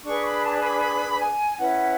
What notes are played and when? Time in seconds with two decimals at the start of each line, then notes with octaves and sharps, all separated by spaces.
0.05 D4 G#4 B4 C#6
0.25 B5
0.43 A5
0.62 B5
0.81 B5
1.19 G#5
1.58 C#4 E4 B4 F#5